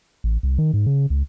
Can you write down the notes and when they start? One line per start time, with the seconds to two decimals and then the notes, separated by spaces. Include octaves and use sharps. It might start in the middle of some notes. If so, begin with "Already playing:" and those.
0.24 A1
0.43 C2
0.58 D#3
0.74 G#2
0.86 C#3
1.10 C#2